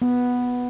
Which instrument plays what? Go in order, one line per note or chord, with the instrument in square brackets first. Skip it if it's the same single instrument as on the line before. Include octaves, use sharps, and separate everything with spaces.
[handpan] B3